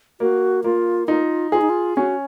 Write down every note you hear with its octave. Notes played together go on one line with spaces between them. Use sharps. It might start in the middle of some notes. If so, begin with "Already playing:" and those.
A#3 F#4
A#3 F4
D#4 F4
F4 G#4
D#4
F4
C#4 F#4